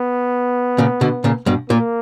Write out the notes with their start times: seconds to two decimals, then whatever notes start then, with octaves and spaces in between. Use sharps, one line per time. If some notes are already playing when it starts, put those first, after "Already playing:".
Already playing: B3
0.78 A#2 C#3
1.01 B2 D3
1.24 A#2 C#3
1.46 G2 B2
1.69 A#2 A#3